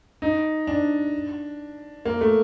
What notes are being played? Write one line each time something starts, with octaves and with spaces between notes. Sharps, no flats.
D#4
D4
A#3
A3